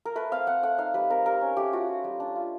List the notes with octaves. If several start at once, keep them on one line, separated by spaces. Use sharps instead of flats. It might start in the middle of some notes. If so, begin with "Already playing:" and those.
A#4
A3 B4
C4 F5
C4 F#5
A3 F#5
D#4 F5
G3 B4
C4 A#4
G3 A#4
C#4
A3 G4
F4 F#4
F4
G3
D4
F4